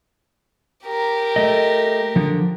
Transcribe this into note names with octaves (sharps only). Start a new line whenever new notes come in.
G4 A#4
A3 D#5
D3 F3